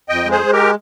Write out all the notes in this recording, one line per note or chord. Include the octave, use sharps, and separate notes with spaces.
F2 D#5 G5
G#3
G#4 C5
G#3
G4 A#4